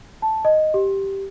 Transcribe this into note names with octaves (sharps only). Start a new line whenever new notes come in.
A5
D#5
G4